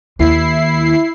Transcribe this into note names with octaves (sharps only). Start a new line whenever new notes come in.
D#2 E4 C7